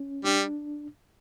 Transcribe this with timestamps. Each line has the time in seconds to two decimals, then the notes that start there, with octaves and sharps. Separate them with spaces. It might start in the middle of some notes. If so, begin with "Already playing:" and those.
Already playing: C#4
0.25 G3 D4